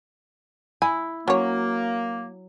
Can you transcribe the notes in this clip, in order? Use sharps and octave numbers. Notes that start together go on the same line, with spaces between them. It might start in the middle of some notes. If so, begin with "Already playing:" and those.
E4 G#5
F#3 A#3 C#4 C#5